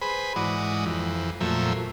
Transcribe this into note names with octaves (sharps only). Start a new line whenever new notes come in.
G#4 B4 C5 B5
G#2 E3 F#4 D5 D#6
F2 E3
F2 A#2 F3 F#3 A3 E5